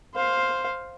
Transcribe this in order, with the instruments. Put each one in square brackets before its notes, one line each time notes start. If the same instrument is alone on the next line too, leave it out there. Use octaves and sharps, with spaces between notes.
[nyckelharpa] C5 F5